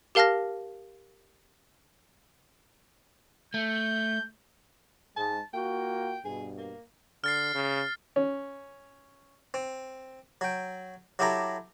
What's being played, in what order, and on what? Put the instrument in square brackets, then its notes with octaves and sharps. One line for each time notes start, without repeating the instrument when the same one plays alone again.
[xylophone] G4 A#4 F5 A5 F6 A#6
[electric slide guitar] A3 [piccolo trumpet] G6
[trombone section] G#2 G#3 [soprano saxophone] A5
[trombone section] A#3 F4 F#4 [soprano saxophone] G5
[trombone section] G2 B2 [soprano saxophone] G#4
[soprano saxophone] A#3
[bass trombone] D3 [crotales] F6 A6 C7
[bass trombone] C#3
[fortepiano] C#4
[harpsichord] C4
F#3 G5
F#3 E4 G4 A4 A#5